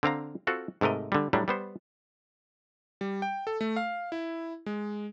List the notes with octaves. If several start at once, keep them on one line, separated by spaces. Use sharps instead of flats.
D3 C4 F5 A#5
C4 F4 F#4 A4
G#2 C3 A3 A#4 D#5
D3 G3
A2 F#3 G3 D4
G3 B3 C5
G3
G5
A4
A3
F5
E4
G#3